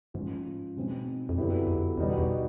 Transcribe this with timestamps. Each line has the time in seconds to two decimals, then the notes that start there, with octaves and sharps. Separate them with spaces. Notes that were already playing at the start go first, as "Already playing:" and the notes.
0.14 G#2 F3 G#3 C#4 F4
0.76 B2 G#3 C4 D#4
1.29 F2
1.37 F#2 D3 F#3 B3 E4 G4
1.67 F2
1.98 E2 B2 G3 B3 D#4 F#4
2.18 E2